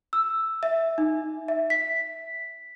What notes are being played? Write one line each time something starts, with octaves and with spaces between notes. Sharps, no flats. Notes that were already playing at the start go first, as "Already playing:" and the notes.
E6
E5
D#4
E5
B6